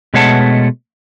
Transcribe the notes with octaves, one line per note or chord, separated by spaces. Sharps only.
B2 G#3 A3 C#5 F#5 A5